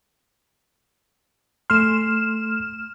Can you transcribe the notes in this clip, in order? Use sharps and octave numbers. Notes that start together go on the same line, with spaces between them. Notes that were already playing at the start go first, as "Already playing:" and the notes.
A3 C6 F6 E7